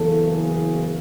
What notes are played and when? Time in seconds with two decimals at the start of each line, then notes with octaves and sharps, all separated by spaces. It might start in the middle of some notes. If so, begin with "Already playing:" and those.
Already playing: F#1 E2 C#3 E3 A4
0.31 G#4